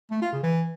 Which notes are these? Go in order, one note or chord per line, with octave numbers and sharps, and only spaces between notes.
A3
F4
C#3
E3